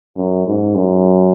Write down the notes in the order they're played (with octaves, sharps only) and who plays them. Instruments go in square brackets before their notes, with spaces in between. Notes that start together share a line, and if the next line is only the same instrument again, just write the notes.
[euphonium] F#2
G#2
F#2